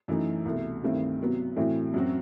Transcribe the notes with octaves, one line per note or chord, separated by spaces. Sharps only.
F#2 E3 A3 D#4
C2 B2 A3
G2 D#3 A3 C4 E4
C3 F#3 B3
A2 E3 A3 C4 F#4
F#2 F#3 C4 F#4